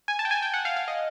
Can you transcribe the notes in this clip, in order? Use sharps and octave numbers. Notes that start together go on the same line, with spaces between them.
G#5
A5
G5
G#5
G5
F#5
F5
F5
D#5